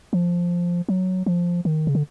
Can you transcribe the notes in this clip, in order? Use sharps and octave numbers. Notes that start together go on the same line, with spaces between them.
F3
F#3
F3
D#3
C#3
D3